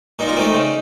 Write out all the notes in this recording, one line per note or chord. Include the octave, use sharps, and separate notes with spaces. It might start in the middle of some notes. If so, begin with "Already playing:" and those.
A#2 D#4
F4
A3 C4 D#4
C#3